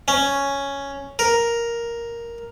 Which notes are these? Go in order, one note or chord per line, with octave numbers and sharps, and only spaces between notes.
C#4
A#4